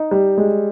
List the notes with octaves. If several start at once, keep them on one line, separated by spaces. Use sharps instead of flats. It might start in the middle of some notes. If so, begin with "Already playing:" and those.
Already playing: D#4
G3
G#3